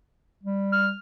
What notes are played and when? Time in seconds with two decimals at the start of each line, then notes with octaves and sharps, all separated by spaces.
0.43 G3
0.72 F6